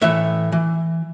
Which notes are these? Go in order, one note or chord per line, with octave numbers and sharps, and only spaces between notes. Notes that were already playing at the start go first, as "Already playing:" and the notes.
A2 E3 E5
E3